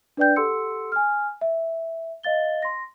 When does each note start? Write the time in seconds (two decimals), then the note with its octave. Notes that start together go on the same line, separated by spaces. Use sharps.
0.17 D4 B4 D5 G5 G6
0.36 G4 A4 F#5 C6 E6 C#7
0.92 G#5 F6
1.41 E5
2.23 D#5 F5 A6 G7
2.62 C6 A#6